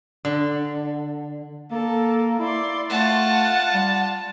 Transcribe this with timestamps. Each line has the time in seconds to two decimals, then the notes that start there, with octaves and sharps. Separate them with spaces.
0.25 D3
1.71 A#3 A4
2.39 E4 D5 C6
2.90 A3 F4 F#5 A5
3.74 G3